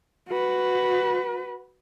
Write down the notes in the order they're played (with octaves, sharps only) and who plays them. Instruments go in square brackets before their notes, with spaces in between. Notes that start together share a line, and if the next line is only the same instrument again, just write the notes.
[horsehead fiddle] F#4 B4